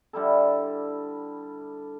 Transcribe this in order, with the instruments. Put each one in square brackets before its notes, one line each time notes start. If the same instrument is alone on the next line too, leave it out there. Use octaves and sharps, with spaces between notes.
[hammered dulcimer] D3 G3 E4 A4